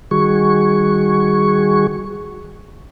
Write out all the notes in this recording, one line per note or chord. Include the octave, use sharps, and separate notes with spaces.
D#3 G3 F#4 G#4 C#6